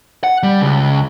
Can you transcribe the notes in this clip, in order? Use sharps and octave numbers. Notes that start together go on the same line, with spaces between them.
F#5
G3
C#2